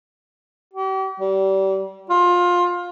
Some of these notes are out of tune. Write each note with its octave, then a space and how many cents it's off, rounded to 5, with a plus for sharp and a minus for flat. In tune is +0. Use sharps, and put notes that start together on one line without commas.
G4 -40
G3 -30
F4 +20